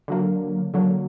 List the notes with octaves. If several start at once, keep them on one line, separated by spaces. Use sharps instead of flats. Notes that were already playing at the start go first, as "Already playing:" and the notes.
D3 F#3 A#3
D3 F#3 A#3